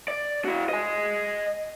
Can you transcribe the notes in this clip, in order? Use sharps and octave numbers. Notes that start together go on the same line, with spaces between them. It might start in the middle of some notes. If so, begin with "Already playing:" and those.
D5
E4 F#4
D#5 G#5